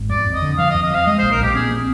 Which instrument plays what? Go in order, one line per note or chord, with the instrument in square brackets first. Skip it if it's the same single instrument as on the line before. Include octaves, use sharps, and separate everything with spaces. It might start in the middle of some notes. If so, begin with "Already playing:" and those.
Already playing: [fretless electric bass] G#1
[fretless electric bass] F2 [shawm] D5
[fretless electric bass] F2
[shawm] D#5
[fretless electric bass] D3
[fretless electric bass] F3 [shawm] F5
[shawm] D#5
[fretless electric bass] F2
[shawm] D#5
[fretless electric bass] F3 [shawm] F5
[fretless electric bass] G#3 [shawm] D#5
[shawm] C5
[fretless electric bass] A#1
[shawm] A#4
[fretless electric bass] A#1 [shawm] G4
[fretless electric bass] C4 [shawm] G#4
[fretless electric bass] C4